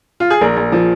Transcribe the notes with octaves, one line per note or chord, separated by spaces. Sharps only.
F4
G#4
A#1 A#4
A#1
F3